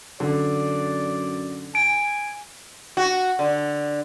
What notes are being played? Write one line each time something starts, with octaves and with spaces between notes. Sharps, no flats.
F#2 D3 D5
G#5 D7
F#4
D3